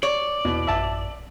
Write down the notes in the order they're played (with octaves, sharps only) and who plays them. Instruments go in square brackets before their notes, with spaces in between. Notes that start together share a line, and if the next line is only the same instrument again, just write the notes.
[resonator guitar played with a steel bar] C#5 [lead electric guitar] D5
[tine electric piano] E2 E4 [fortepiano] B2
[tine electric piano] A1 F#2 [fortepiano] E5 A5